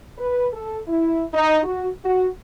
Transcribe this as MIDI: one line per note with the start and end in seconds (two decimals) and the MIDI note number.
0.18 0.47 71
0.53 0.79 69
0.88 1.23 64
1.34 1.59 63
1.64 1.88 66
2.04 2.27 66